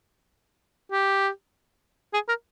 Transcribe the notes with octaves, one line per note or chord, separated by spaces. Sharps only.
G4
G#4
A#4